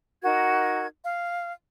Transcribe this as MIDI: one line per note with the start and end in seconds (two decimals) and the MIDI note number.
0.24 0.86 63
0.24 0.86 66
0.24 0.86 70
0.24 0.86 92
1.04 1.52 77